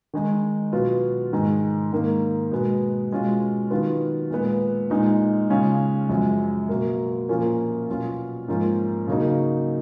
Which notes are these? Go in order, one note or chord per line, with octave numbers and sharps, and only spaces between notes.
D#3 G#3 D#4
B2 F#3 B3 F4
G#2 D#3 G#3
G#2 D#3 A#3
B2 G#3 B3
B2 G#3 C#4 F4
D#3 F#3 B3 F4
A#2 G#3 B3
A#2 G#3 D#4
C#3 G#3 C#4 F4
F#2 F3 G#3
B2 F#3 A#3
A#2 F3 A#3 C#4 F4
B2 F#3 C#4 F4
G#2 F3 A#3 C#4 F4
C#3 F#3 A#3 D#4